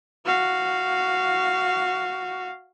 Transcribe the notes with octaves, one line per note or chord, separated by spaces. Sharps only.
F#4 F5